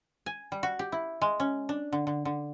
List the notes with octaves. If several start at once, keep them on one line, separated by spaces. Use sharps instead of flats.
G#5
G3
F#4
G4
E4
G#3
C#4
D4
D3
D3
D3